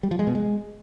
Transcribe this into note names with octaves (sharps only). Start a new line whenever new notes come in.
G3
F3
G#3
B2
G#3